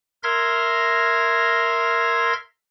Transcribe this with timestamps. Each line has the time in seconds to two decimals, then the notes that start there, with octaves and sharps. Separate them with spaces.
0.23 A#4 E5 C6 F6 G#6 A#6